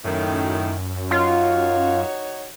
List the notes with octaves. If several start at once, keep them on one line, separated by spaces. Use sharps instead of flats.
F#2 A2 D#3
D#4 F4 F#4 C#5